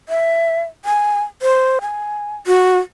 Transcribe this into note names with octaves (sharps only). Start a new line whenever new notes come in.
E5
G#5
C5
G#5
F#4